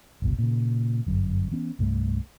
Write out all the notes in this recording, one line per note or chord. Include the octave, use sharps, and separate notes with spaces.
F#1 C2 B2
A#2 C#3
G1 F#2
E3 B3 C#4
C2 G2 A3